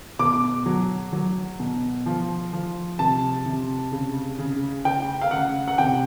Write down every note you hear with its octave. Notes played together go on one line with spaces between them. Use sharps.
B2 D6
F#3
F#3
B2
F3
F3
C3 A5
C3
C#3
C#3
C#3 G5
F5
C#3 F#5
F#5
C3 G5